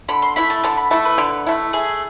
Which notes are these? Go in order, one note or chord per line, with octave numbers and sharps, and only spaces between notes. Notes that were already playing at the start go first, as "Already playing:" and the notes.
D3 B5
C6
A3 E4 B5
A5
D3 A5
B5
A3 E4 A5
B4
D3
A3 E4
A3 G#4